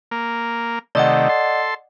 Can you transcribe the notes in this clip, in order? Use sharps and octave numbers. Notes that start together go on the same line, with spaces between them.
A#3
C3 D#3 A3 D5 D#5 F#5
A4 C6